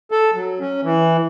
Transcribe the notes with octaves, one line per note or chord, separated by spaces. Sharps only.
A4
F#3
C#4
E3